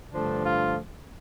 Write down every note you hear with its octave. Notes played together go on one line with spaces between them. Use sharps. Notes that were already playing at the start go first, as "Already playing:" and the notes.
G2 D3 F3 A3 D4
F4